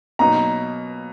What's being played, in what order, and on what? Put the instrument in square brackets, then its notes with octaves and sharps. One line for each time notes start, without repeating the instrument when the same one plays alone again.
[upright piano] B2 F#3 A#3 D#4 [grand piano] A#5